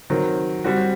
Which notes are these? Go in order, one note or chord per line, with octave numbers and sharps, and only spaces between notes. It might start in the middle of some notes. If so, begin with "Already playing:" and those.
D#3 F#3 C4
G3 C4 F#4